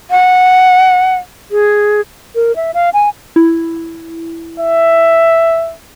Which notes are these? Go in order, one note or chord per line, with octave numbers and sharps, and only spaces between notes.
F#5
G#4
A#4
E5
F5
G#5
E4
E5